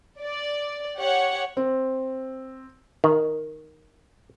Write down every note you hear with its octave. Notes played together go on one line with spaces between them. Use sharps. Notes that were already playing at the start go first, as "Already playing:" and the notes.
D5
G4 C#5 F#5
C4
D#3